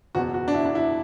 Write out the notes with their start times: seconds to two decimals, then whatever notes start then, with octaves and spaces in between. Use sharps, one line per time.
0.15 F#1 E2 B2 F#4
0.34 F#4
0.48 D4
0.54 E4
0.66 D4
0.75 E4